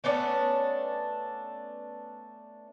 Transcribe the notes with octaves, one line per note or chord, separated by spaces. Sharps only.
A3 B3 C#4 D4